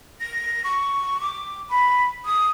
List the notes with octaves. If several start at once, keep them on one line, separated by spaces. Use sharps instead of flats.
A#6
C#6
D6
B5
D#6